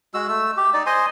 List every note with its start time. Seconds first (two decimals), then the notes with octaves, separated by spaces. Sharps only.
0.14 G#3 F#4 E6
0.28 A3 E6
0.57 G4
0.74 D#4 D5
0.86 C5 D#5 G#5 C6